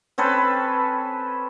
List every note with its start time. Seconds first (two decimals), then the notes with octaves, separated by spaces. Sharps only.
0.18 C4 C#4 A4 B4